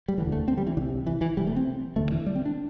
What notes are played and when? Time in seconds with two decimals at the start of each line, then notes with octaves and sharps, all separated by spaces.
0.08 G3
0.18 E1 D2 D3 E3
0.32 A3
0.48 C4
0.58 G3
0.67 E3
0.77 C2 D3
0.81 C3
1.07 E3
1.21 E3
1.36 E1 E2 C3 G3
1.47 A3
1.56 C4
1.96 E1 D2 D3 A3
2.11 E3
2.26 G3
2.36 C4
2.46 D4